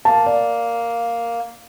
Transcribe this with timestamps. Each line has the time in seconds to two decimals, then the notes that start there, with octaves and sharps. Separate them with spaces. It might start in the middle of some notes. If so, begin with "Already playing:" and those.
0.05 A#3 A5
0.26 D5